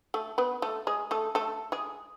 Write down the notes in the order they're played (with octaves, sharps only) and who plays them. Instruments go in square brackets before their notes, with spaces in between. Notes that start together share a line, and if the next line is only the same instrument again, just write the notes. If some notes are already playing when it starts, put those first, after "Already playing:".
[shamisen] A3 A4
B3 B4
A3 A4
G#3 G#4
A3 A4
A3 A4
G#3 G#4